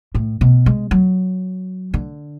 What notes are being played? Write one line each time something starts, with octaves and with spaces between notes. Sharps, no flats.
A2
B2
G#3
F#3
D3